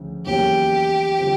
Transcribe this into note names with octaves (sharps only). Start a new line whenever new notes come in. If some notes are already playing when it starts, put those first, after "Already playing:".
Already playing: D2 C#3 F3
E2 C#3 F#3 A#3 G4
D3 G3 C4 F4